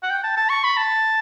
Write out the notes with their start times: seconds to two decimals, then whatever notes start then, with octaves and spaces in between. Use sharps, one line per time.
0.03 F#5
0.10 G5
0.23 A5
0.37 A5
0.49 C#6
0.64 B5
0.77 A5